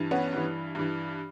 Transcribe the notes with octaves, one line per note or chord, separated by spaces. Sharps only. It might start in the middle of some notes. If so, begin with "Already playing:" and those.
Already playing: G2 E3
B3 C#4
G2 E3
G2 E3